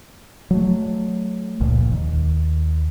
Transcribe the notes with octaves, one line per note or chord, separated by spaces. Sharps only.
F#3 A3
F1 C#2 A#2
D#2